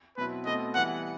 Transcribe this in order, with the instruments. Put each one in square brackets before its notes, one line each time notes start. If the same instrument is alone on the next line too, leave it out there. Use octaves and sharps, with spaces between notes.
[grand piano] B2 F#3 C4 E4 [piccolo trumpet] B4
[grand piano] B2 A3 C4 [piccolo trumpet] D#5
[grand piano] E3 G3 B3 E4 [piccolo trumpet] F#5